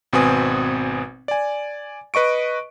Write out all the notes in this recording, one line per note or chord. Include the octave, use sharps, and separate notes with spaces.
G#1 B2 C4 B4 G#5 D#6
D5 G#5
B4 D#5 C#6 D7